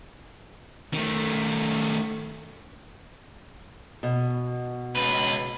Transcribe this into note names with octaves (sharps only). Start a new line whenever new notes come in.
D#3 A3
B2
C#2 B4